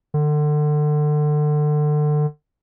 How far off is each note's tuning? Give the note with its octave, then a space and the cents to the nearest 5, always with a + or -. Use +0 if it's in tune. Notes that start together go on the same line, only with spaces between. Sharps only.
D3 +30